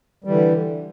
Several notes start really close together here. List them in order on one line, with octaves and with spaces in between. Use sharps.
G3 E3 D3